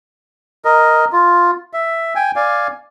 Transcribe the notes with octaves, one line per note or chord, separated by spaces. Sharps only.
A#4 D#5
F4
E5
G5 G#5
D5 F5 G#5